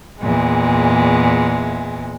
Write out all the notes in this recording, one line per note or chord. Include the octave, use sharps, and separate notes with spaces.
E2 A#2 G#3